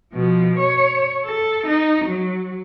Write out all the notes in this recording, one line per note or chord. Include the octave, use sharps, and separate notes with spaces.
B2 F3
C#5
A4
D#4
F#3